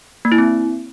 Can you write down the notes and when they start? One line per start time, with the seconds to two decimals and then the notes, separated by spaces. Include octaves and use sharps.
0.25 A#3
0.32 E4
0.38 C4